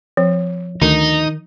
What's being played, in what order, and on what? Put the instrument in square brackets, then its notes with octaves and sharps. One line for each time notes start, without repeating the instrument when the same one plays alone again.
[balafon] F3 [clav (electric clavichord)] C4
[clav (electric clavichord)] D2 [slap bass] D#3 [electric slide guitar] D#4